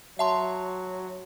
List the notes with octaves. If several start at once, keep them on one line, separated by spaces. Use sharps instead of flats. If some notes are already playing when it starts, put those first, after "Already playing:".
F#3 E5 A5 C6